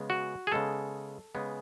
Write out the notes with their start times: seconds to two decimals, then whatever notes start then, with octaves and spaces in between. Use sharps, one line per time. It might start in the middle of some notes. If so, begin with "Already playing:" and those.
Already playing: C#3 G#3 B3
0.10 F#4
0.47 G#4
0.52 C#3 G#3 B3 A4
1.35 C#3 G#3 B3